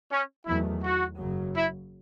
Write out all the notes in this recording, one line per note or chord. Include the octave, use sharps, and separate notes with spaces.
C#4
E2 D#3 F#3 A3 E4
F#4
F#1 F#2 C#3 F#3
E4